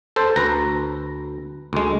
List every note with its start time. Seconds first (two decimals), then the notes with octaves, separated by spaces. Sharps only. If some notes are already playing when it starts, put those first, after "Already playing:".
0.16 A4 C5
0.36 D2 B4 A#5
1.73 D2 G#3